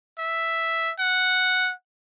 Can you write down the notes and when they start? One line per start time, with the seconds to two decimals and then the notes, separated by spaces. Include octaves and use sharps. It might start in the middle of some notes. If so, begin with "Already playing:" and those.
0.18 E5
0.99 F#5